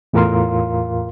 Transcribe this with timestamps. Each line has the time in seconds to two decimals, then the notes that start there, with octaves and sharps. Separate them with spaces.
0.13 E2 A2 F4 A#4 F5 C6